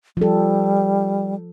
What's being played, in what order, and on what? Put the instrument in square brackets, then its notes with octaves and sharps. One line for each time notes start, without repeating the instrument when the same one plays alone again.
[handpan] F3 A4 [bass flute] G3